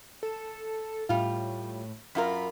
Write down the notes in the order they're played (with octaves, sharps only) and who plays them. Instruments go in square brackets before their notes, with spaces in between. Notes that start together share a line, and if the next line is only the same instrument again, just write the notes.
[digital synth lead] A4
[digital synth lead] A2 [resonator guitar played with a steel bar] G3 F4
[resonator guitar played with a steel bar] F#2 F4 A#4 [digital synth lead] B5